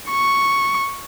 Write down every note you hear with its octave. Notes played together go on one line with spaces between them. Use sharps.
C#6